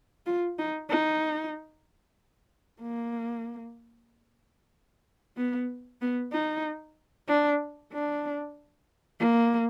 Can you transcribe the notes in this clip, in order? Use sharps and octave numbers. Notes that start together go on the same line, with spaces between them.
F4
D#4
D#4
A#3
B3
B3
D#4
D4
D4
A#3